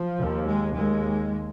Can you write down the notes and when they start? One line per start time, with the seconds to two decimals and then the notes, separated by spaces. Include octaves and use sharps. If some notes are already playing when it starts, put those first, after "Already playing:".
Already playing: F3
0.18 D#2
0.48 G#3
0.76 D#2 G#3